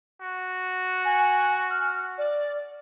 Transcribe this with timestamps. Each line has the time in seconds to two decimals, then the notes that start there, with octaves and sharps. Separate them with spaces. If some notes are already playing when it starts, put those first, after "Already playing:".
0.21 F#4
1.05 G#5
1.70 F6
2.18 D5